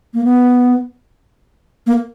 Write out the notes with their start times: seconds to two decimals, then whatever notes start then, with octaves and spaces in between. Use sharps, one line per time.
0.14 A#3
0.24 B3
1.87 A#3